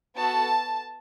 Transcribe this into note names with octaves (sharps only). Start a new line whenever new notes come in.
B3 F#4 A4 A5